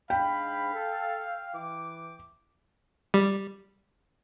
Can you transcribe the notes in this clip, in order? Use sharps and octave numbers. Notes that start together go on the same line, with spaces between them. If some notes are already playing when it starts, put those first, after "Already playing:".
G#2 D4 F5 G5 B5
A4
E3 D6
G3